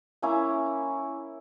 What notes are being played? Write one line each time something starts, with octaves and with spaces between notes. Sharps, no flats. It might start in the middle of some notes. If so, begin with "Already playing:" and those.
A#3 C#4 E4